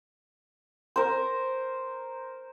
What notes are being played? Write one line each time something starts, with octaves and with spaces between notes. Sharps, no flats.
A#4 C5